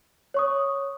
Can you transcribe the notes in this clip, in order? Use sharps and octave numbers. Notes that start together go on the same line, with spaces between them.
C#5 C#6 D#6